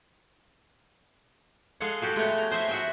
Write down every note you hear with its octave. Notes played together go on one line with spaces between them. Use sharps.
G#3 G#4 A4 F5 F#5
F#3 F#4 G4 A4
G#3 A3 B3 C#5
A#5
C5 D#5 E5 G#5
F#4 E5 G5